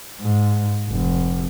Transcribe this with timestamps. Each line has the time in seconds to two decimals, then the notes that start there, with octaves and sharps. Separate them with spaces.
0.21 G#2
0.90 F1